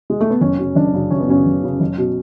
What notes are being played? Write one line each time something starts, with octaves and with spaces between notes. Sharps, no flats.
G#3
A3
B3
F#1 C#4
F#2 C#3
F#1 D4
F#2 C#3
F#1 C#4
B3
F#2 C#3 C#4
F#1
F#2 C#3
F#1
B2